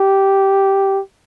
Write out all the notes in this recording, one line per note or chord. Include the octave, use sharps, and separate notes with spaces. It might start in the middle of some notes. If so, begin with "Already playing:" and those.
Already playing: G4